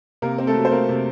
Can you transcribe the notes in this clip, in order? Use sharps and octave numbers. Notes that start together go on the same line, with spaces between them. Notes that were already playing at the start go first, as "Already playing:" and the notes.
C3 A#3 A#4
C4
A3 A4
F#3
C5
A3 A#3 A#4
C3